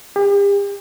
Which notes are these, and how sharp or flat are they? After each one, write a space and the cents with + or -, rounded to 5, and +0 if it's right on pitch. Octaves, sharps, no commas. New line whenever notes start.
G4 +40